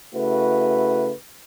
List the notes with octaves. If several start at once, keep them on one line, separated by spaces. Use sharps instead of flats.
C#3 A3 E4 F#4 B4